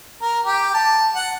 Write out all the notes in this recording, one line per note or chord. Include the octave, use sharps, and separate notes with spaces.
A#4
G4
A5
F#5